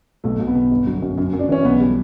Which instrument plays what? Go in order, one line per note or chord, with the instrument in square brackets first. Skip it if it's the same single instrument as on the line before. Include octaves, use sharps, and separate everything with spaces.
[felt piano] B1 [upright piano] A3
[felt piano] B1
[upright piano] B3
[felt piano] B2
G1
F#3
F#2
F#2
F#2
[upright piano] D4
[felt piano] E3 [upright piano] C#4
[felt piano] B1 [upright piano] B3
[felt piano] G3